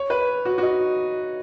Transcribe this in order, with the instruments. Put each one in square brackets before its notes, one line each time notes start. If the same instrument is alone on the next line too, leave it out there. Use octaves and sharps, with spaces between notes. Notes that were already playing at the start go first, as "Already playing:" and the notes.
Already playing: [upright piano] C#5
B4
F#4
F#4
D#4